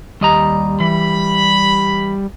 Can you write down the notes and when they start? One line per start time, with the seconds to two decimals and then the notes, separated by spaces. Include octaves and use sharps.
0.21 D#2 G3 D#5 A#5
0.80 E3 B5